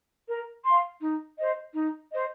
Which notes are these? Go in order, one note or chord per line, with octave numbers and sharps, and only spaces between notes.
A#4
F5 C6
D#4
C5 D#5
D#4
C5 D#5